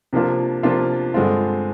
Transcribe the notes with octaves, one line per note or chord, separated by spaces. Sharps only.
C3 F3 A#3 D4 F4
C3 F3 A#3 D4 F4
G2 D3 G#3 C4 F4